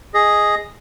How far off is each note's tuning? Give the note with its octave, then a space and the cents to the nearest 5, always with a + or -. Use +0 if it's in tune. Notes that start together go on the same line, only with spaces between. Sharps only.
G#4 +0 D#5 +0